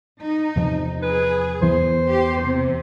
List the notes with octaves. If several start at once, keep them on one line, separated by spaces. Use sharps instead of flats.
D#4
E2 C3 F3
G#4 B4
E2 E3 B3 C5
G4
C3